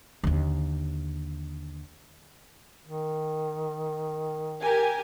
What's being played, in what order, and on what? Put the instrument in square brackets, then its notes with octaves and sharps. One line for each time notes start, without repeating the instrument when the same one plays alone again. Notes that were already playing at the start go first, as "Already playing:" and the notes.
[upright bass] D#2 D3
[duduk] D#3
[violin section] G4 A#4 G#5